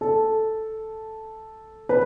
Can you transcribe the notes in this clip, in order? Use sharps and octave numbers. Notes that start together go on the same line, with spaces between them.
A4
B4